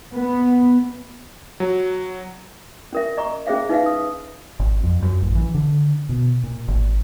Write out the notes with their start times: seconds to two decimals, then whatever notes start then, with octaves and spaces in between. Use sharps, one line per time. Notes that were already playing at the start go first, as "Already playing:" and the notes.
0.14 B3
1.60 F#3
2.93 C#4 A#4 E5
3.17 D#5 A#5 C#6
3.47 C#4 G#4 C5 E5 F5
3.69 D#4 B4 E5 F5
3.86 D#6
4.59 G#1
4.83 F2
5.02 F#2
5.22 A1
5.35 E3
5.55 D3
6.09 B2
6.43 A#2
6.68 G#1